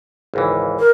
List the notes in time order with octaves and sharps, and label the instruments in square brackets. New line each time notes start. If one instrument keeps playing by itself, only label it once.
[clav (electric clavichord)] G#1 C#2 E3
[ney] A#4